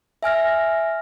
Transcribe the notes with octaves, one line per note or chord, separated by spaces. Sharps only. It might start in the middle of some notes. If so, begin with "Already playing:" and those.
E5 G#5 F6 A#6